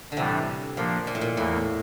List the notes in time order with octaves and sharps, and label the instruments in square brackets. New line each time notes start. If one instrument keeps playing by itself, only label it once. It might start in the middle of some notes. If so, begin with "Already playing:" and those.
[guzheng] D3
[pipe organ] A2 E3 G3 D4 A4 [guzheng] C3
[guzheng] A#2 [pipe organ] F3 A#3 D4
[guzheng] A#2
A2
A#2
[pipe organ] E2 E3 A#3 [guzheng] A2